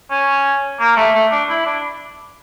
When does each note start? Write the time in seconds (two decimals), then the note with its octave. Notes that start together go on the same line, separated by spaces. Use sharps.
0.10 C#4
0.80 A#3
0.97 A3
1.14 A3
1.32 D4
1.49 E4
1.66 D4